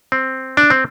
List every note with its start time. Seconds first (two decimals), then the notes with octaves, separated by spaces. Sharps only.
0.12 C4
0.57 D4
0.70 C4